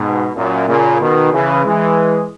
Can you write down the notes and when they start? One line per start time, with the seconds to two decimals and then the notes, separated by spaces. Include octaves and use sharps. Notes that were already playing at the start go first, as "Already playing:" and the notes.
Already playing: G#2 B2
0.35 F#2 A#2
0.68 A#2 C#3
1.01 B2 D#3
1.33 C#3 E3
1.65 E3 G#3